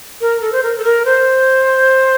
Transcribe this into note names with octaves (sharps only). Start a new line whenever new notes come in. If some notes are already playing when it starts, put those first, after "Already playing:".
A#4
A4
C5
A#4
A4
A#4
C5